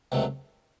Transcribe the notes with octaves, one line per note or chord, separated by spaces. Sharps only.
C#2 C3 D#3 F#3 A3